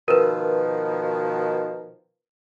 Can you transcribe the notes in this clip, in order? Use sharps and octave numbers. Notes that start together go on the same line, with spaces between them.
B2 D#3 F3 A#4 B4